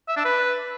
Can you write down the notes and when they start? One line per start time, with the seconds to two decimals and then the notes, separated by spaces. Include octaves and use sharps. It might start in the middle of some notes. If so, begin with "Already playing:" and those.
0.09 E5
0.17 D4
0.25 B4